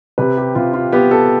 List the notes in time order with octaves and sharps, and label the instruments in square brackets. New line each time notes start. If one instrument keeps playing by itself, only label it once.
[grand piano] C3 B4
G4
C3 F4
F4
B3 G4
A4